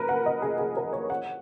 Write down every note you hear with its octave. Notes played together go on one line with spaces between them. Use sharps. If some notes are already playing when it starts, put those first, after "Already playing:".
Already playing: A#4 B4
F#5
D#5
G#4
G#4
A#4
C#5
F#5